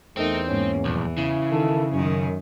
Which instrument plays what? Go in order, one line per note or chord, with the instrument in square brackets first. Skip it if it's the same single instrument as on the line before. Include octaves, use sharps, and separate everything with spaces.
[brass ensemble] E2 [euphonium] A3 [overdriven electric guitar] C4 [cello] D#4 A#4
[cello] G#2 A#3 [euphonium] C#4
[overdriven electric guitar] B1 F2 [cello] E3
[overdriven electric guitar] C#3 [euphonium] E4
[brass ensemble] D#3 A4
[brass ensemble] F#2 [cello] D#3 C#4